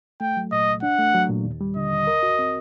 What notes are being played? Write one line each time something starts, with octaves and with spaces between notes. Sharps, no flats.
A3 G5
F#3
A#2 D#5
C2
D4 F#5
A3
F#3
A#2
D#2
G3
D3 D#5
D#2
A#4
F#4
C4